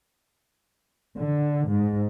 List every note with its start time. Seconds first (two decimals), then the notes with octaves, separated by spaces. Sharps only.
1.17 D3
1.69 G#2